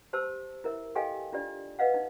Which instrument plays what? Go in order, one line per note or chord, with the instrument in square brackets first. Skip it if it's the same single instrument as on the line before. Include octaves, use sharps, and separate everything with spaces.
[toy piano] G4 C5 A5 E6
E4 A#4 E5
G4 A4 D#5 F5 G5 G#5
D4 F4 G4 D5
B4 D#5 F5 F#5
D#4